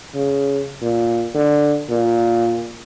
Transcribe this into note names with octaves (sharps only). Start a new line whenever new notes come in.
C#3
A#2
D3
A#2